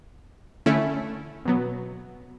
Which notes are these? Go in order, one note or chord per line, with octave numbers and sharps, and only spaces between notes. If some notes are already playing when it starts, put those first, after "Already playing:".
D3 A3 C#4 E4
B2 F#3 B3